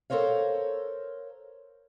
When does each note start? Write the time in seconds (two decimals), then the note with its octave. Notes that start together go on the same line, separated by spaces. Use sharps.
0.10 A4 A#4 C5 C#5 F5